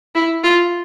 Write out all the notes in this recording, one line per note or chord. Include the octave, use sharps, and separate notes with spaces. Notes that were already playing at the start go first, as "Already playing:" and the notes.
E4
F4